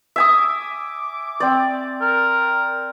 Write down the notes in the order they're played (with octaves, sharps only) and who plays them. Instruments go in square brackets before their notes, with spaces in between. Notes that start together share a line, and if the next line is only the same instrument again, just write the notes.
[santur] E5 G#5 D#6
[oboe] D6
[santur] C4 D5
[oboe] A#4